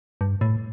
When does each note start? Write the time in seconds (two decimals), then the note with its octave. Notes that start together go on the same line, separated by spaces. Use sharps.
0.21 G2
0.41 A2